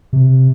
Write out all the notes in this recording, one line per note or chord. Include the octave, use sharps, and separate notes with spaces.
C3